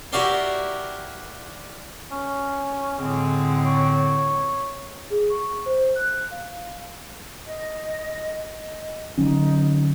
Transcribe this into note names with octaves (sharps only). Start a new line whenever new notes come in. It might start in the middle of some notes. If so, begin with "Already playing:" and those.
E4 F#4 G4 A#4 D5 C6
C#4
A2 D3 G#3 C4
C#5
G#4
C#6
C5
F#6
F5
D#5
D#5
D3 F#3 C#4 D#4